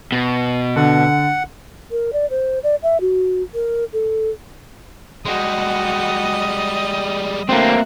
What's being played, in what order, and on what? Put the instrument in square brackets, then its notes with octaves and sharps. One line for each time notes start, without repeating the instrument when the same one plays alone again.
[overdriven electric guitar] B2
[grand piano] D3 [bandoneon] F#5
[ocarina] A#4
D5
C5
D5
E5
F#4
A#4
A4
[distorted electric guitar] G3 G#3 [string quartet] F#4 [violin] D#5
[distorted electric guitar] A3 D4 [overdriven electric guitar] A#3 C4 [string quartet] F#4 E5